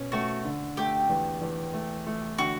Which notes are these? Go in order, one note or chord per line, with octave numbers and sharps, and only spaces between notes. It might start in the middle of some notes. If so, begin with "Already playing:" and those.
Already playing: B2 C#4
A3 F#4
D3
A3 G4
E2
E2
A3
A3
D3 F#4